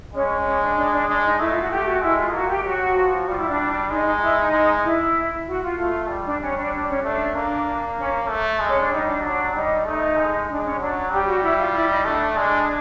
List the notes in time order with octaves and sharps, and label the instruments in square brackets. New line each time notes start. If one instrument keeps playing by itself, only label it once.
[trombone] G#3 [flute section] C#4
[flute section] C#4
D4
D4
D4
[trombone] G#3 [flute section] D4
[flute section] D#4
[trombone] A3 [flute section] E4
[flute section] F4
F#4
[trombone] A3 [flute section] G4
[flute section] F#4
[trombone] G#3 [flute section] E4
[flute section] F4
[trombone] A#3 [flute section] F#4
[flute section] G4
[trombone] F#3 [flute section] F#4
[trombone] F3
[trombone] G3 [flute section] F4
[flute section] E4
D4
[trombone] G#3 [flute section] D#4
[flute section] D#4
E4
D#4
[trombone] G#3
[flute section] E4
F#4
F4
[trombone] A3 [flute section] F4
[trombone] G3
[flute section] D4
[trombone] G3 [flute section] C#4
[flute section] D4
D4
C#4
[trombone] A3 [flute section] D4
[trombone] A#3 [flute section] D4
[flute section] C#4
[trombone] A3
G#3
[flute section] C#4
D4
[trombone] G3 [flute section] D#4
[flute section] D4
[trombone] F#3 [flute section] D4
[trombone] G3 [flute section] D#4
[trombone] A3 [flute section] D#4
[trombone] G#3
[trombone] G#3 [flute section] D4
[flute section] C#4
[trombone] F#3 [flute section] D4
[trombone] G3 [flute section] G4
[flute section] F#4
E4
F4
E4
D#4
[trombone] A3 [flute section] D4
[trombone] G#3 [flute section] D4